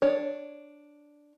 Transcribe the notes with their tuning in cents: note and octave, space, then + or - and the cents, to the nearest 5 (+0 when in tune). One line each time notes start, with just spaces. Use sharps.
D4 +0 C#5 +0